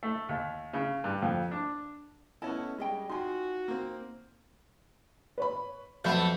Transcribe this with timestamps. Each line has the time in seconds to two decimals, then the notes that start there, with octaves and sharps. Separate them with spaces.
0.03 A3
0.29 D#2
0.73 C#3
1.04 G2
1.22 F2
1.51 D4
2.42 A3 B3 C#4 E4 D#5 A5
2.78 G3 G#3 C#4 D#5 G5
3.10 D#4 F4 F#4 G5 G#5 C6
3.68 A#3 C4
5.38 B4 C#5 B5
6.04 B1 F2 F3 A3 F#5 B5 G6